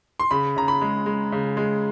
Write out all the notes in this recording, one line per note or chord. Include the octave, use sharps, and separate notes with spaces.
C6
C#3 B5
C#3 A#5
B5
G#3
G#3
C#3
G#3